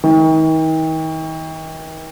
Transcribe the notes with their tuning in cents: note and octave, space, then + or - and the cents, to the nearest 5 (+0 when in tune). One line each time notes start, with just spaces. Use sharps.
D#3 +40